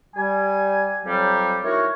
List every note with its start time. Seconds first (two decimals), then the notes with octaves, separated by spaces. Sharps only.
0.15 G3 G#5
1.05 F2 F#3 G3
1.63 D#3 E4 F#4 A#4 C#5